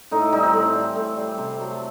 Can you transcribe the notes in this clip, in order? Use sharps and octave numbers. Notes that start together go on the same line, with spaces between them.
A2 D#4
E4
E3 G3 D#4
C4
A2
G3
A2
G3
C3
F#3 A3